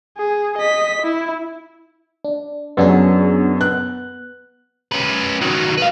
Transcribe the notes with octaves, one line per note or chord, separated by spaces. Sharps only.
G#4
D#5 B6
E4
D4
F#2 F#3 B3 D4 G#4
B3 F#6
C#4 B4
D#3 F#3
B4 F5